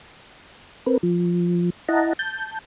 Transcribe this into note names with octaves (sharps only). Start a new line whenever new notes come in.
C4 A#4 B4
F3
E4 D#5 F#5 A5 A#5
A5 G6